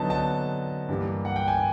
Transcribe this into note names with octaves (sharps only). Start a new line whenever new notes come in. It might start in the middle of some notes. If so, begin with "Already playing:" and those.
Already playing: D3 F#3 B3 D#4 A5
A5
G2 E3 G3 A#3
F#5
G5
G#5